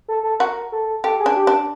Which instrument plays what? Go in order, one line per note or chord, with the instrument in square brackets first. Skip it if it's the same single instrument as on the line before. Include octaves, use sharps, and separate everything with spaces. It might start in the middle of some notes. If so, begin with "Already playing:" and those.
[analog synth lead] A4
A4
[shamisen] F#4 [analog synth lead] A#4
[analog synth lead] A4
[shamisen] G4 [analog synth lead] A4
[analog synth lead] G#4
[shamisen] D4
[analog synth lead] G4
[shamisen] D4